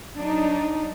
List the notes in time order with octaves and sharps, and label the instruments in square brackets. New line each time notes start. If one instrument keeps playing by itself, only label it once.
[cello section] F#3 D4 D#4